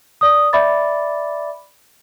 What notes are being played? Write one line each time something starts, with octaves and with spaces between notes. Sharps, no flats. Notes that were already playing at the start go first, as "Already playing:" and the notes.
D5 D#6
D5 E5 B5 D6 A6